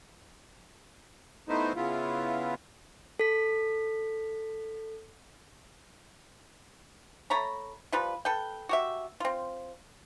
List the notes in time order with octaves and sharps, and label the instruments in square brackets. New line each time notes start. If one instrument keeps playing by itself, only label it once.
[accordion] A3 B3 D#4 E4 C5
C#3 B3 E4 F4
[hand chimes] A4 B6
[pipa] A3 C#5 A#5 B5
F3 G3 F4 B4
A4 B4 G5
F#4 G4 E5
C4 F4